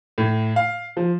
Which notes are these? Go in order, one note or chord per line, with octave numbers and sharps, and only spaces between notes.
A2
F5
F3